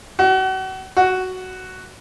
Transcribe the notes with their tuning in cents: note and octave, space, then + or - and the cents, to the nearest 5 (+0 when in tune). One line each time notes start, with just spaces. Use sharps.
F#4 +35
F#4 +5